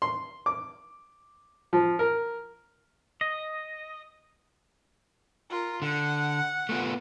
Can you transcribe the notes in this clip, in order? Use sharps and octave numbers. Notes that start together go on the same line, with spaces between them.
C6
D6
F3
A#4
D#5
F4 A#4
D3 F#5
A3 B3 F4